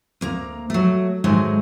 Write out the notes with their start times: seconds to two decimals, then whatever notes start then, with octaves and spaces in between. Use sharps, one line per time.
0.21 D2 A#3 A#5
0.70 F#3 A3
1.24 G#2 D#3 F#3 G#3 A3